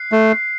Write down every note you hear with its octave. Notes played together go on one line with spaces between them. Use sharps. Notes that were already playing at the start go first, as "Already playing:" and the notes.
Already playing: F#6 C7
A3